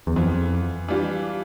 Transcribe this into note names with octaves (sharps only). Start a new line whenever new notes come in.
E2
F2 E3 B3 F4
E3 G3 D4 F4